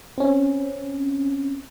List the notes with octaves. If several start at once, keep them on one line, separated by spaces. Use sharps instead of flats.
C4 C#4